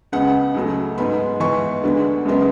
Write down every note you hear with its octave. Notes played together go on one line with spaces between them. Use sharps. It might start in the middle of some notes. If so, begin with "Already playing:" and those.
C#2 C#3 G#3 B3 F#5
C#2 C#3 F#3 A3
G#2 G#3 B3 B5
G#2 E3 B3 C#6
D2 D3 G#3 B3
F#2 C#3 G#3 B3